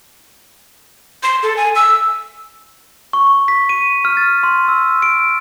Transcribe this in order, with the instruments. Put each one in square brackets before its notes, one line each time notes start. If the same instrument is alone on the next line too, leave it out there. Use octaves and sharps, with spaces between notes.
[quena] C6
A4
G#5
E6
[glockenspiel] C#6
C#6
B6
D#7
F6
A6
C6
E6
D7